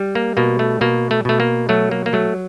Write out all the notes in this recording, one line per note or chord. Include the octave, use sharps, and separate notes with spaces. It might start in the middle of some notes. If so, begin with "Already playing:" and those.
Already playing: G3
A#3
B2 A#3
A3
B2 A#3
A3
B2 A3
A#3
F#3 A3
A#3
A#3
F#3 A3